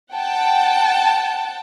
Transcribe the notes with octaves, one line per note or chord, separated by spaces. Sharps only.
F#5 G5 A5